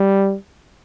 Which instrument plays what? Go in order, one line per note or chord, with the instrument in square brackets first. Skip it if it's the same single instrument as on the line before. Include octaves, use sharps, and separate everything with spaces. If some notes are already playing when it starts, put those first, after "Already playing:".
Already playing: [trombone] G3